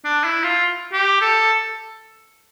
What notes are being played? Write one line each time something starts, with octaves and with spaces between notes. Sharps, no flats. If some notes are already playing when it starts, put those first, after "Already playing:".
D4
E4
F4
G4
A4